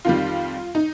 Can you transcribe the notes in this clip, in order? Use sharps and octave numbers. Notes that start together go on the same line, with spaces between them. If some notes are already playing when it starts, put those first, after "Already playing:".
F2 D#3 G3 F4
D#4